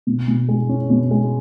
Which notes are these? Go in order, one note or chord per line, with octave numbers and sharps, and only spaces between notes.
B2
B2
G#3
C#4
B2
G#3